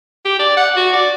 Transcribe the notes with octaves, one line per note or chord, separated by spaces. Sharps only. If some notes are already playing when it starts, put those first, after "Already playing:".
G4
D5
F#5
F#4
D5